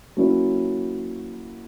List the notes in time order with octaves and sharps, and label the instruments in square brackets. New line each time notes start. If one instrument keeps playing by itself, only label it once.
[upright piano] F#3 A#3 C#4 E4